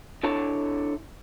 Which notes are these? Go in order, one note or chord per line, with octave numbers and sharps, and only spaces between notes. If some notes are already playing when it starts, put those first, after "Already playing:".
D4 E4 A4 C#5 A5